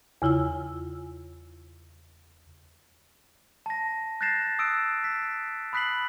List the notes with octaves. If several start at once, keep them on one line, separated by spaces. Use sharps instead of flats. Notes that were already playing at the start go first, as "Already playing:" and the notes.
E2 C#3 E4 F4 E6
A5 A#6
F#6 G6 A6 A#6 C7 E7
D#6 E6 F#6 D7 E7
B6
B5 D#6 F#6 B6 C7 F#7